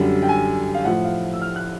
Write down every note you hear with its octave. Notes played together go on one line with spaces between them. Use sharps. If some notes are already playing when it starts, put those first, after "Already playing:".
Already playing: F#2 D3 G3
G5
G#5
F5
A2 F3 F#5
F5
E6
F6
F#6